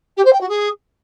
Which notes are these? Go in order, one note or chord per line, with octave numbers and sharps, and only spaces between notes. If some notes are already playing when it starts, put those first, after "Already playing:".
G4
C5
G5
F#4
G#4